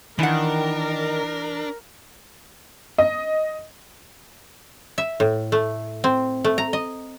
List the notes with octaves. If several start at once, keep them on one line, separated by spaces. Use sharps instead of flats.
D#3 E3 D4 A#4 F#5
D#5
E5
A2
A3
C4
A3
A#5
D#5